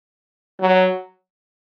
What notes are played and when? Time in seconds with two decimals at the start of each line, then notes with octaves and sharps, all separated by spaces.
0.61 F#3